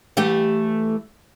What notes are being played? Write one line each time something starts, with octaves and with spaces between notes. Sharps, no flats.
E3 A3 G4